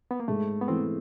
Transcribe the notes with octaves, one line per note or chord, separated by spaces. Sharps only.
B3
A#3
G#2 A3
B3
E3 A3 C4